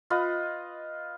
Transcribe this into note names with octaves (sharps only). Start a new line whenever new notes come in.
F4 B4 D#5